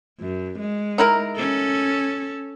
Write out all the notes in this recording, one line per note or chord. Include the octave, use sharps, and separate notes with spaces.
F#2
G#3
D#4 E4 A#4
C#4 A4